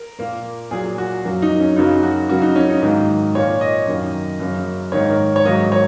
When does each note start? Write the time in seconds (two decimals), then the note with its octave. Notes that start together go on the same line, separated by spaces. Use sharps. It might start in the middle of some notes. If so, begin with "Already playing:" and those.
Already playing: A#4
0.19 A#2 A#3
0.71 A#2 F#3 A#3 G#4
0.98 F#4
1.24 F#2 F#3 A#3
1.42 D#4
1.60 C#4
1.76 F#2 C#3 F#3 A#3 D#4
2.03 F#4
2.29 C#3 F#3 A#3 F#4
2.42 D#4
2.56 C#4
2.69 D#4
2.81 G#2 D#3 F#3 A#3
3.35 A#2 A#3 C#5
3.61 D#5
3.87 F#2 D#3 A#3
4.40 F#2 C#3 F#3 A#3
4.92 G#2 D#3 A#3 C#5
5.09 A#4
5.36 C#5
5.45 G#2 D#3 F#3 A#3 D#5
5.72 C#5